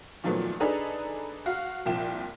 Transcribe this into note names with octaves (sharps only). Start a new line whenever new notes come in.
A#2 D#3 F3 F#3 A3 B3
D4 D#4 G#4 A4 B4 A#5
F#4 F5 F6
C2 A#2 F3 G5 E7